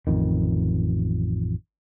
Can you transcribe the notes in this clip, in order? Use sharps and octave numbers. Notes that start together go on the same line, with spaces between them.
A1 F2 D#3